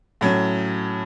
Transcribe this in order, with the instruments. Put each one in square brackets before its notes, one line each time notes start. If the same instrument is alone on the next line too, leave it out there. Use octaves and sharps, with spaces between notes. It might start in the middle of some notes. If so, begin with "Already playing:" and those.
[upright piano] A2 F#3 C#4